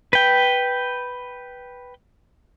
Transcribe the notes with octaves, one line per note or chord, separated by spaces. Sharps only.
B4 G5